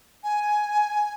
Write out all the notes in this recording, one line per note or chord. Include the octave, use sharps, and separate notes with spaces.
G#5